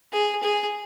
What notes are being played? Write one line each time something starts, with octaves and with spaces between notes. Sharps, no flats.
G#4
G#4